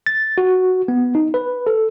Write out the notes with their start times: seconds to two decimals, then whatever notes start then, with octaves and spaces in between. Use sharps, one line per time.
0.06 A6
0.38 F#4
0.88 B3
1.15 D#4
1.34 B4
1.67 A4